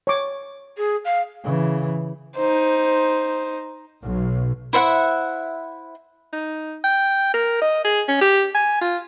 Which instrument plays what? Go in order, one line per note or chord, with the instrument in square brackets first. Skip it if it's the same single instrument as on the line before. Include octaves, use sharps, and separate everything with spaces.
[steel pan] C#5 D6
[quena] G#4
F5
[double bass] C#3 E3
[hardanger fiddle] D#4 C5
[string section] B1
[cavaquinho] E4 C5 E5 F#5
[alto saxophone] D#4
G5
A#4
D#5
G#4
C#4
G4
G#5
F4